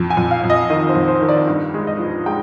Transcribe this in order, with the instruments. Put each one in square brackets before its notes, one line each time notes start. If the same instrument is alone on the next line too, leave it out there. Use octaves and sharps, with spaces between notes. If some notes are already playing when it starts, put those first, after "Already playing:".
Already playing: [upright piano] F2
G#5
F2
F5
F2
D#5
D#3 D#5
C5
F2
C5
D#3
D5
G2
G#3
D#5
F3
G#3 G5